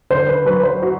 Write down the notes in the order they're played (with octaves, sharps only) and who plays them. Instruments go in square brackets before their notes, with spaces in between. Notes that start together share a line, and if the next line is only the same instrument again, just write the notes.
[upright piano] D3 [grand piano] C5
[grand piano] B4
[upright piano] F#3 [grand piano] B4
[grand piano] C5
[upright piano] F#4